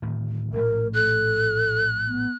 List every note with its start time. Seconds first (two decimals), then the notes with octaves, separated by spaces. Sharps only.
0.02 D1 A2 D#3
0.54 A#1 A2 A3 A#4
0.94 A4 F#6
2.07 B3